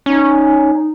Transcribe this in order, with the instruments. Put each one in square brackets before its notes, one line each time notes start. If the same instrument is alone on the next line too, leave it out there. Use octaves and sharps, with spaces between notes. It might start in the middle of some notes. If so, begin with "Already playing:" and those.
[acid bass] C#4 [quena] D#4